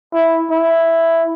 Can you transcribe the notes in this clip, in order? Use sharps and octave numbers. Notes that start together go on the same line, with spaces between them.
E4
E4